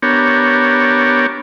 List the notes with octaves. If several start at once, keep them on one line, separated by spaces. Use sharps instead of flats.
B3 D4 G4 A#4 C#5